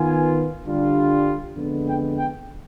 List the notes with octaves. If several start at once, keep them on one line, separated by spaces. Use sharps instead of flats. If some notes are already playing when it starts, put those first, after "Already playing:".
Already playing: D#3 B3 F4 G#5
D3 G3 D4 F4
F2 D3 G#3 B3
G5
G5